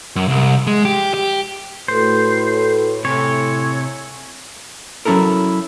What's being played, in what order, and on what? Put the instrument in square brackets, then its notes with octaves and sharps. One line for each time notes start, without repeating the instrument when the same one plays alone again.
[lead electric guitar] F#2
C2
G#3
G4
G4
[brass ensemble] A2 [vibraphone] F#4 A4 B4 [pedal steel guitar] C5
[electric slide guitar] C3 [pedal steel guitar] C#5 [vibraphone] G#5 E6
[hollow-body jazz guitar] F#3 C#4 E4 A4 A#4